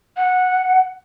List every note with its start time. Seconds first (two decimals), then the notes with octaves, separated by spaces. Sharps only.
0.17 F#5